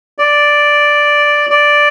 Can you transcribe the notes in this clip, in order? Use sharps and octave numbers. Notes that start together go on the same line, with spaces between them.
D5
D5